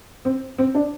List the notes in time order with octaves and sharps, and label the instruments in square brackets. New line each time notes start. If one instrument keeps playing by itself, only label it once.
[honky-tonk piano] C4
C4
D4